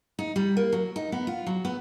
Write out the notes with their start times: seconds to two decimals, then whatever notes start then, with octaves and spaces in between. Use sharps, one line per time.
0.19 D#4
0.36 G3
0.57 A#3
0.72 F#3
0.96 D#4
1.12 B3
1.27 F4
1.46 F#3
1.65 B3